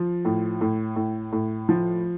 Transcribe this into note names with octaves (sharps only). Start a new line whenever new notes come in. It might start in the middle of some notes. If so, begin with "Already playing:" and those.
Already playing: F3
A2
A2
A2
A2
F3